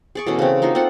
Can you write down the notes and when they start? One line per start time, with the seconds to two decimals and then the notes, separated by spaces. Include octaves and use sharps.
0.15 G#4 D5 C#6
0.27 B2 E3 A3 C#4
0.39 C#3 C4
0.62 A#3 D#4 F4 F#4
0.75 C4 F4 A4 F#5